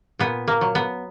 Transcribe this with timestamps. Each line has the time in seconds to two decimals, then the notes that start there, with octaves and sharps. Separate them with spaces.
0.19 A#2 B3
0.48 A#3
0.61 F#3
0.75 B3